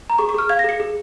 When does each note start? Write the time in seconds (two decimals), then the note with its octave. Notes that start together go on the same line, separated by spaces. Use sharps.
0.10 A#5
0.19 G#4 C#6
0.29 C#6
0.34 G#4 F6
0.49 F5 G#6
0.59 A#6
0.64 G#4 C#7
0.80 G#4